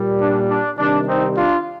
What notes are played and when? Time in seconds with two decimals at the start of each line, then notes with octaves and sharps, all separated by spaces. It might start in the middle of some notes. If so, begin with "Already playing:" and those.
Already playing: A#2 G3
0.20 D4
0.49 D4
0.78 C3 D#3 G3 D4
1.07 C4 D#4
1.37 D4 F4